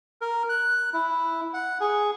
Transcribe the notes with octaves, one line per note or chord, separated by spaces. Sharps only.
A#4
F#6
E4
F#5
G#4